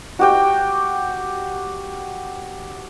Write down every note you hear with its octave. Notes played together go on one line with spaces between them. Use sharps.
F#4 G4 G5